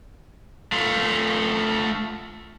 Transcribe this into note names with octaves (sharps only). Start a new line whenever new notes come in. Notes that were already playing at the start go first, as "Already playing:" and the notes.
A3 F4